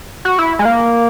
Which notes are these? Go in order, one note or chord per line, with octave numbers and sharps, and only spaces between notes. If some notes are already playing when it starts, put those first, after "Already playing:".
F#4
E4
G#3
A#3